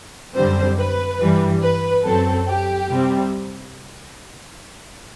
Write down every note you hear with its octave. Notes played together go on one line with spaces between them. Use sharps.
F#2 D3 G3 C4 C5
B4
G2 E3 G3
B4
F#2 F#3 C4 A4
G4
C3 G3 C4